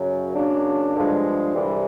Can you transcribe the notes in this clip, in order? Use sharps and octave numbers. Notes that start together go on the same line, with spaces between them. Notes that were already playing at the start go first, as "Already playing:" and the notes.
Already playing: F#2 C#3 F#3
C#3 F#3 A#3 D4
G2 D3 F3 G#3
C2 C3 E3 G3